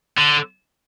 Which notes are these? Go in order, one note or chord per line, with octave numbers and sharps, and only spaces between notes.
D3